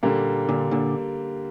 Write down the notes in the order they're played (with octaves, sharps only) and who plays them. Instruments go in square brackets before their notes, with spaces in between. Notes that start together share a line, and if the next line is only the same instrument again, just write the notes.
[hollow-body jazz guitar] A#2 [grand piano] D3 G3 A#3
[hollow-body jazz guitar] A#2 D3
A#2 D3